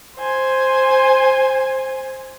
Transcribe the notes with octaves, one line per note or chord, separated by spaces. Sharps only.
C5 G#5